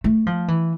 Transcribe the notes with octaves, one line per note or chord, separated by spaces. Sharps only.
A3
F3
E3